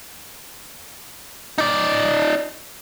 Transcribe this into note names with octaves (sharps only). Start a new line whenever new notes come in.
D#4 D5